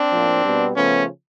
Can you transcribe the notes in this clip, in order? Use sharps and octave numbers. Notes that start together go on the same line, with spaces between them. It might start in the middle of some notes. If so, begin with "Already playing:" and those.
Already playing: C4 D4
A2 F3 A#3
B2 G3 B3
C#3 F3 A3 B3 C#4